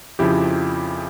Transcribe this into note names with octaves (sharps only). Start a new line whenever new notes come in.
F2 C#3 F3 E4 G4